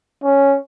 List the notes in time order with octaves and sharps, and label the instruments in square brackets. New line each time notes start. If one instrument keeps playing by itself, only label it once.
[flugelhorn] C#4